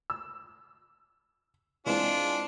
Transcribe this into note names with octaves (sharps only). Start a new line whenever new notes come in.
E6
E3 G#3 C4 D4 F4